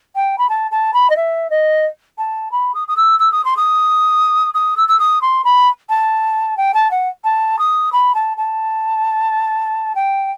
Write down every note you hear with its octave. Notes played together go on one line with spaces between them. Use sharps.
G5
B5
A5
A5
B5
D#5
E5
D#5
A5
B5
D#6
D#6
E6
E6
D#6
C6
D#6
D#6
E6
E6
D#6
C6
B5
A5
G5
A5
F#5
A5
D#6
B5
A5
A5
G5